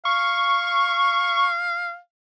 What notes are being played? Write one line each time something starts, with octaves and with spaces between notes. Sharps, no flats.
F5 C#6